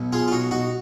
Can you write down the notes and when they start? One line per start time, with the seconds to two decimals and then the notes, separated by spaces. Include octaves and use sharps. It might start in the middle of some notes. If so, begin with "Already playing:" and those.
Already playing: B1 B2 F#3
0.12 F4 G#4
0.28 F4
0.32 D#4 F#4
0.51 D#4 F#4